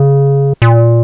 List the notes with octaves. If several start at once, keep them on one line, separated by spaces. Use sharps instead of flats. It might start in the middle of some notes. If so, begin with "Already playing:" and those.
Already playing: C#3
A#2